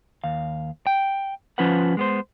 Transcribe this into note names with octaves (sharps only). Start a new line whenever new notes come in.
D#2 F5
G5
F3 C#4 F4 B4 C5 F#5
G#3 B3 C5